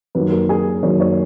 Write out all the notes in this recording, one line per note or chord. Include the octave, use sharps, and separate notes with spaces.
F#2 D#3 F#3 A#3 B4
A#4
G#4
F#2 D#3 F#3 A#3 C#5
C#5